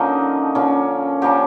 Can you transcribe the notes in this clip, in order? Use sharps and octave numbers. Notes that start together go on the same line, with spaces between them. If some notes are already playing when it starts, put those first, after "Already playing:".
Already playing: D3 F3 A#3 C#4 D#4
D3 F3 A#3 C#4
D3 F3 A#3 C#4 G4